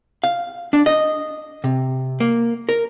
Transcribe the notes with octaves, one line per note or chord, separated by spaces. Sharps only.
F5
D4
D#5
C3
A#3
A#4